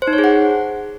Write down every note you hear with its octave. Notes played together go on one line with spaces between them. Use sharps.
C5
D#4
C#5
G#4
F#5